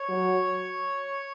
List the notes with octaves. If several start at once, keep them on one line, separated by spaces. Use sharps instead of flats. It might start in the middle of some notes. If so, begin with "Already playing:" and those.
Already playing: C#5
F#3